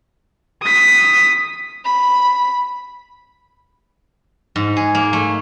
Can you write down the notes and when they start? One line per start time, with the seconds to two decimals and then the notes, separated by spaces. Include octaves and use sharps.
0.63 D#6 B6
1.84 B5
4.56 G#2
4.77 G#4
4.95 A#3
5.13 A3